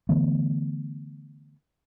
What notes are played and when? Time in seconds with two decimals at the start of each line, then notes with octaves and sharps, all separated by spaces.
0.09 D3 E3 A3 B3